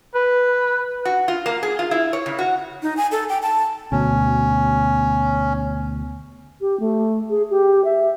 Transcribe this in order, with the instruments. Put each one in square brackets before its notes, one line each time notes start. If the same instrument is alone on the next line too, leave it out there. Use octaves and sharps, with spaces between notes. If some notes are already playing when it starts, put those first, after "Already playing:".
[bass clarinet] B4
[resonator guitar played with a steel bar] F#4
F4
A#3
G#4
F4
E4
C#5
C#3
F#4
[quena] D#4
G#5
A4
G5
A5
[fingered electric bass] D2 B2 [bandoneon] C#4
[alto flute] G4
A3
G#4
G4
E5